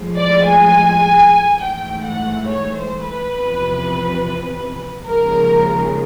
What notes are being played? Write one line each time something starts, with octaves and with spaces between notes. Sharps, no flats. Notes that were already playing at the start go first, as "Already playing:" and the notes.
Already playing: A2 F3 G#3
D5
G#5
G#2 E3 A3 G5
F#5
C#5
C5
B4
E2 C3 F3
D#2 C#3 F3 G#3 A#4